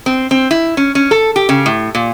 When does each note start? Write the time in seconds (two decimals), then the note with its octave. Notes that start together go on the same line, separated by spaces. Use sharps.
0.06 C4
0.31 C4
0.51 E4
0.77 C#4
0.95 C#4
1.11 A4
1.36 G4
1.49 C#3
1.66 A2
1.95 A#2